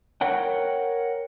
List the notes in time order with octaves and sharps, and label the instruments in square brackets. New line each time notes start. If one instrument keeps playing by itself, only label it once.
[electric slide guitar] A#4 C#5 F#5 G5